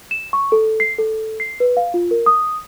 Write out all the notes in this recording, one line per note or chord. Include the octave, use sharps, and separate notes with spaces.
E7
C#6
A4
C7
A4
C7
B4
F5
F4
A#4
D#6